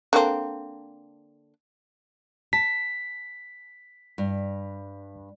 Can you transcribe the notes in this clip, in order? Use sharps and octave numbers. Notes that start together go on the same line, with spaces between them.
D3 A#3 C4
A5 B6
G2